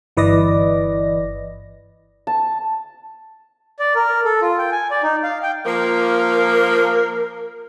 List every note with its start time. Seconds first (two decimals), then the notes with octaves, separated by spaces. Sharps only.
0.17 G1 E3 B4 D5 D#5 A#6
2.27 A5
3.79 D5
3.95 A#4
4.25 A4
4.42 F4
4.58 G5
4.72 G#5
4.91 D5
5.03 D#4
5.23 F5
5.43 G5
5.66 F3 A#3 A#4